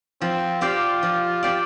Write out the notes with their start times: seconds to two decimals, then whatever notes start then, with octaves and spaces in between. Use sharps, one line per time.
0.21 F3 C4
0.61 C4 F4 G4 D5 F5
1.03 F3
1.43 C4 G4 D5 F5